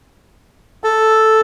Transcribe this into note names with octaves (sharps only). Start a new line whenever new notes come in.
A4